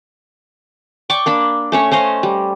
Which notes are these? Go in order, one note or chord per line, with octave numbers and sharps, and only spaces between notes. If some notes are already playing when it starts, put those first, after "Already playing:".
D5 G5 C#6 D6
A#3 D4 B5
A3 C#4 C#5
C#4 C5 D#5 F5
G3